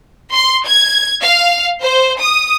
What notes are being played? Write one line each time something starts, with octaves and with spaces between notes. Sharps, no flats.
C6
G#6
F5
C5
D#6